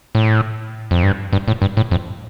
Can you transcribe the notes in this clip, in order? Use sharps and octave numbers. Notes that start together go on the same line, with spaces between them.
A2
F2
G2
G2
A2
G2
A2
F2